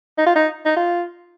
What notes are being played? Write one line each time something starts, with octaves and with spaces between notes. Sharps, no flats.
D#4
F4
D#4
D#4
F4